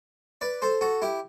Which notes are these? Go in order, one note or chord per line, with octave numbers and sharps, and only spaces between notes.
B4 D5
A4 C5
F#4 A4
E4 G4